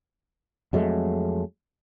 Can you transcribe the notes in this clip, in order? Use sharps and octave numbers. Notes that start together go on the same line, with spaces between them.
F2 F#3 G#3 A3